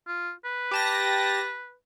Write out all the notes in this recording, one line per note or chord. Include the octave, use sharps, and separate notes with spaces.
F4
B4
G4 A5 A#6